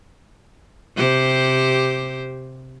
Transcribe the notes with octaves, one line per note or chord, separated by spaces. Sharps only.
C3 G4 C5